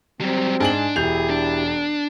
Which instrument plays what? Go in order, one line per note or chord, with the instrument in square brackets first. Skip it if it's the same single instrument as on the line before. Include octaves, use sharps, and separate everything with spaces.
[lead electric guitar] F#3 G3 [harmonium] C4
[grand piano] G#2 G#4 F#7 [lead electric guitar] D4
[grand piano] E1 G6 F7 [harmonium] E4 G4 [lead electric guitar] G#4
[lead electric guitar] D4